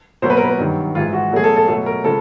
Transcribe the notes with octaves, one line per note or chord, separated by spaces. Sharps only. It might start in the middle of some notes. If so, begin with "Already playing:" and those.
B2 F#3 A#3 C5
B4
A#4
B4
G2 D#3 F#3
G#2 E3 G#3 F4
F#4
B2 F#3 A3 G#4
A4
A4
B2 F#3 A3 A4
A#4
C#3 F3 G#3 A4